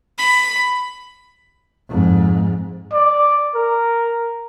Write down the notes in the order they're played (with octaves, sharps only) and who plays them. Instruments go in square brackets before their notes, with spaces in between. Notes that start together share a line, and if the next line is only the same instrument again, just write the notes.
[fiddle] B5
[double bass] F2 G#2
[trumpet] D5
A#4